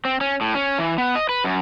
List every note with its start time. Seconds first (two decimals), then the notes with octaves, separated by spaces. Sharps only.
0.05 C4
0.21 C#4
0.41 A2
0.55 C#4
0.78 E3
0.98 B3
1.15 D#5
1.29 B4
1.44 F#2